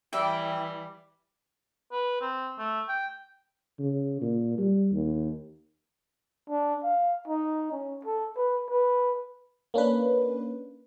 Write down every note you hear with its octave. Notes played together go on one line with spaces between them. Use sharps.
E3 G3 E5 G5
B4
C4
A3
G5
C#3
A#2
G3
D#2
D4
F5
D#4
C#4
A4
B4
B4
A#3 C#4 D4 B4